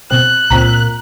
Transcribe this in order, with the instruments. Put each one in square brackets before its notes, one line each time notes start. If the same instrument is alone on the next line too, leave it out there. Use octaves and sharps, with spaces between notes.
[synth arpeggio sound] B2 C4 [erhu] F#6
[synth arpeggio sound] C#2 C4 E6 [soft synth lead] A#2 [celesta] A#5 B6